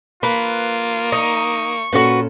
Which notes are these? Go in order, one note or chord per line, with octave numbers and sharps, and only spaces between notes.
A#3 F4 B4
D#4 C#6
A#2 C#4 F#4 A4 B4